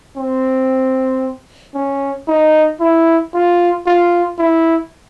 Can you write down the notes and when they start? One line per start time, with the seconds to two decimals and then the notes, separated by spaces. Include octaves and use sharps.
0.17 C4
1.75 C#4
2.28 D#4
2.80 E4
3.34 F4
3.86 F4
4.39 E4